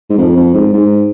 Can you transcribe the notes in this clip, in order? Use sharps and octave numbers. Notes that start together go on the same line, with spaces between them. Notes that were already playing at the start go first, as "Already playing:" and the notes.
G#2
F2
F2
G#2
G#2